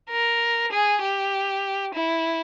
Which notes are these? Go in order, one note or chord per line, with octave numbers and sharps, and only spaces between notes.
A#4
G#4
G4
E4